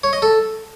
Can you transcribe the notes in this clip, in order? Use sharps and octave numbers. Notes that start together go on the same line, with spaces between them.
C#5
D#5
A4